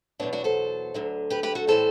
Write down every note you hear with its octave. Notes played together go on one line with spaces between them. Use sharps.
E2 B2 F#3 B3 D4
D4 F#4
A4 C5
D2 D3 F#3
G4 B4
G4 B4
F#4 A4
A2 E3 G3 A4 C5